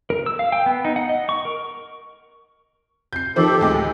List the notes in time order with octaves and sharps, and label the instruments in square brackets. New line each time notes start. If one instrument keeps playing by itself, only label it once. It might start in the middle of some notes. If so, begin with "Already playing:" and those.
[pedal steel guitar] A#4
E6
F5
G5
B3
D#4
F#5
D#5
C#6
A#4
[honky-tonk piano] G6 C7
[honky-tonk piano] D#3 F3 C5 [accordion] G4 A4
[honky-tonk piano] D2 G#3